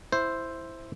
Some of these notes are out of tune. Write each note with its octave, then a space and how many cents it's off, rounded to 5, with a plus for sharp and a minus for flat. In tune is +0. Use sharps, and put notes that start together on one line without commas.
E4 +0 C5 +0